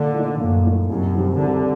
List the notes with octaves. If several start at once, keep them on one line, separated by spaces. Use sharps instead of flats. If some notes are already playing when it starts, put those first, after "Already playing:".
Already playing: A#2 D3
A3 D#4
F#2 A#2
A3 D#4
C2 F#2
C3 D#3 G3
C2 D3